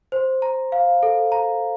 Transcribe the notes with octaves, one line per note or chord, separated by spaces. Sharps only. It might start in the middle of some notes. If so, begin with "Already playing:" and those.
C5
A#5
F5
A4
A#5